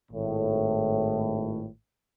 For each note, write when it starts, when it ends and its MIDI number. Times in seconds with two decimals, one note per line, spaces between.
0.12 1.67 32
0.12 1.67 45